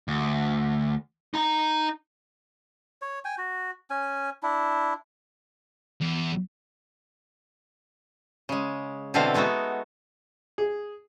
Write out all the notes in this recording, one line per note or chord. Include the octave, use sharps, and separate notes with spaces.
D2
D#4 A#5
C#5
G5 G#5
F#4
C#4 G#5
D4 E4
E2
C#3 G#3
B2 D3 E3 C4 A4 F5
G#3 A3 B3 D#4 F#4
G#4